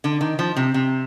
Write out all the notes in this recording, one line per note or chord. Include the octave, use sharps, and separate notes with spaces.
D3
D#3
F3
C3
C3